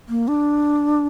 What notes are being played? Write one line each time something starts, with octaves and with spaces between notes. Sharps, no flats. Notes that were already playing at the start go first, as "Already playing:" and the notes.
A#3
D4